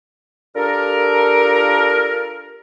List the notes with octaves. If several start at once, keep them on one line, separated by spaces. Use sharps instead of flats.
D4 F4 G4 A4 A#4